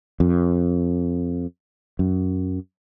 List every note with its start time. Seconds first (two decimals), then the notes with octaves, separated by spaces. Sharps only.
0.20 F2
1.99 F#2